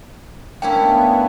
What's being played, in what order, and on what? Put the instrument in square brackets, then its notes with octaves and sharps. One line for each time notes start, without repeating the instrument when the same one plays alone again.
[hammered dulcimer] A2 D4 [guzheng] A#3 C#4 E4 [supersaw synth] B3 [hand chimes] G5